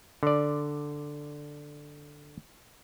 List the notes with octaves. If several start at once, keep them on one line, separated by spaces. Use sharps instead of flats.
D3 D5